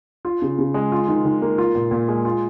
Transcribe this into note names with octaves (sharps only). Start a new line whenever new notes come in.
F4
C#3
C#3
G#3
F4
D#3
D#3
A#3
F4
A#2
A#2
G#3
F4